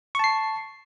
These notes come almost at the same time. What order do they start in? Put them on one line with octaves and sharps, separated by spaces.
C#6 A5 C7